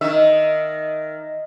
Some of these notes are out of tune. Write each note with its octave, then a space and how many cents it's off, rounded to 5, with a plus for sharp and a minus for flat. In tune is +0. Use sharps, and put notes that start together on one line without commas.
D#3 -5 E5 +0